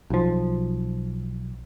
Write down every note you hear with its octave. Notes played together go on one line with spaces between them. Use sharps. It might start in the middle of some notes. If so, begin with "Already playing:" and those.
B1 F3